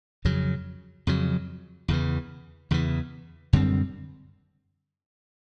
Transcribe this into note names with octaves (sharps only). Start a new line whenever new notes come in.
F2 C#3 F#3
F2 C#3 F#3
E2 C#3 E3
E2 C#3 E3
F#2 D3 G3 C4